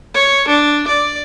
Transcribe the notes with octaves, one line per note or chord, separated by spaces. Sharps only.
C#5
D4
D5